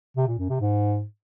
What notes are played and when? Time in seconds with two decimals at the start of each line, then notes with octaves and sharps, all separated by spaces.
0.17 C3
0.28 A#2
0.39 F#2
0.49 C3
0.60 G#2